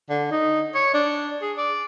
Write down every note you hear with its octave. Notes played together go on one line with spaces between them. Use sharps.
D3
D#4
C#5
D4
G#4
D5